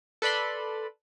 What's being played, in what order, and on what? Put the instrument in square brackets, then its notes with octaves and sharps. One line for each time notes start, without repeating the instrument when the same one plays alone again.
[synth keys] A4 B4 D5 B5 C6